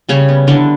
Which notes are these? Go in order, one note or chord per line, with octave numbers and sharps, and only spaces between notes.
C#3 G3 C#4
B3
D3 E3 D4